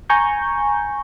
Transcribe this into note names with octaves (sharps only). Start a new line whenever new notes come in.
G#5 A#5 C#6 G6